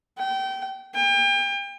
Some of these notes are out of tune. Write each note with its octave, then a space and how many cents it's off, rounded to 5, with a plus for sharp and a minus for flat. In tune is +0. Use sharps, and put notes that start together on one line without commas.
G5 -25
G5 +35